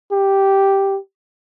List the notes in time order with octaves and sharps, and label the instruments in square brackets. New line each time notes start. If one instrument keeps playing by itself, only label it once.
[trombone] G4